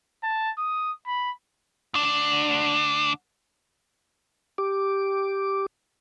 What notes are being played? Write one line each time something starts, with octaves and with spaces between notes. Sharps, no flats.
A5
D#6
B5
D2 D4
G4 D6